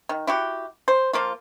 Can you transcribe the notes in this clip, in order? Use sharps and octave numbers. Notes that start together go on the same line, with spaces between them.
D#3
E4 F#4 G4
C5
F3 A#3 F4